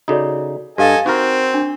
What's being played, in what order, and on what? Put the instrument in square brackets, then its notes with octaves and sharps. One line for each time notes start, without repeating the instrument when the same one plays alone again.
[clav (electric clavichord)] C#3 D#4 [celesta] F#4 A4 D5
[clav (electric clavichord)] G2 [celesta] G4 F5 A6 [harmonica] A4 D#5 G#5
[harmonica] C4 [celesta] D#4 [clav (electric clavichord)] F#4 A#4
[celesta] D4